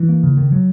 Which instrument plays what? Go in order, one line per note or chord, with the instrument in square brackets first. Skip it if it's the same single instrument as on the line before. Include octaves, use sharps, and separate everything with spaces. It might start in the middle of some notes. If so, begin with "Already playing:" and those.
Already playing: [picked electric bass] E3
A#3
C#3
D#3
F#3